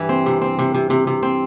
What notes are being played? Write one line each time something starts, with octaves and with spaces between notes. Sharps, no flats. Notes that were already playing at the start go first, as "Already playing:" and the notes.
Already playing: G2 E3 G3
C4
C3
C4
C3
C3
C3
C3
C4